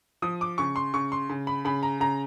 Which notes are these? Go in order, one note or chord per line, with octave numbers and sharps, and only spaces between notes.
F3 D#6
D6
C#3 C#6
C6
C#3 C#6
C6
C#3
B5
C#3 B5
A#5
C#3 A#5